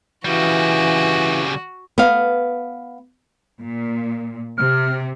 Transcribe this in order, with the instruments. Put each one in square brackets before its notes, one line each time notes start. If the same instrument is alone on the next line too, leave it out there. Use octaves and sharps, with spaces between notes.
[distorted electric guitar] C#3 G3 [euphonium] E3 [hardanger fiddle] F#4
[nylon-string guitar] B3 F5
[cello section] A#2
[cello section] C3 [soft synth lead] F6